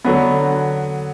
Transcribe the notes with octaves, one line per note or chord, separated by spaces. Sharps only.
D3 F#3 B3